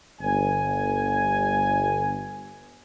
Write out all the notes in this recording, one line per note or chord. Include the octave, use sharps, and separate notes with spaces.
G1 G#5